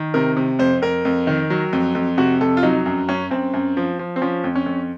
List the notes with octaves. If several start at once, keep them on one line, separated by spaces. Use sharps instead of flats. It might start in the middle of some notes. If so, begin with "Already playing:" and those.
Already playing: D#3
C3 A#4
C3
F2 C5
F2 A#4
F2
D#3
F#3
F2
F2
C3 F#4
F2 A4
F4
F#3 D#4
F#2
F#2 C#4
F#2 C4
F#2
F3
F3
C4
F3 C#4
F2
C#4
F2